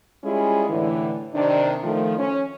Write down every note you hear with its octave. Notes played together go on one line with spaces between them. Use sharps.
G3 G#3 C#4 E4 F4 G#4
A2 D3 E3
C3 D#3 D4
D#3 F3 A3
C#4